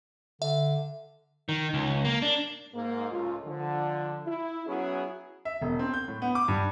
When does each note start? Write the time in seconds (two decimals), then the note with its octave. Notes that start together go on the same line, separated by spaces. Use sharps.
0.42 D3 E5
1.49 D#3
1.74 C#2
2.05 A#3
2.22 D4
2.74 G#2 A#3
3.11 C#2 A2 F4
3.46 D3 F3
4.26 E4
4.66 F#3 B3 C#4 E4 F#4 G#4
5.45 E5
5.62 E1
5.79 C4
5.94 G6
6.08 A2
6.22 B3
6.35 D6
6.48 G2